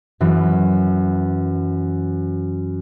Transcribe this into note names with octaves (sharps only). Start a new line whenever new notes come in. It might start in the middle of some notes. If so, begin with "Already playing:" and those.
F#2 E3